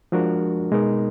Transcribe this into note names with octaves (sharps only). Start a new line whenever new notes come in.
F3 G#3 D4 F#4 A#4
B2 G#3 B3 D#4 A#4